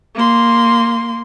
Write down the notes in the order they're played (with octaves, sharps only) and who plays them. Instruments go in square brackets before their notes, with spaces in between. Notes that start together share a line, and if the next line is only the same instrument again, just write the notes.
[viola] A#3 C6